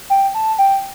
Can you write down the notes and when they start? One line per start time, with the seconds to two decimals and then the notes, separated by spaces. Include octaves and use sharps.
0.10 G5
0.34 A5
0.59 G5